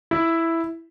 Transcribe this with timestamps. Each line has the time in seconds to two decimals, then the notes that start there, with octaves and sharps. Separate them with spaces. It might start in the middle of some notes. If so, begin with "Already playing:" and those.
0.11 E4